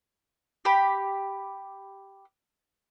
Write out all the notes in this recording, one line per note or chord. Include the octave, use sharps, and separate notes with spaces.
G4 B5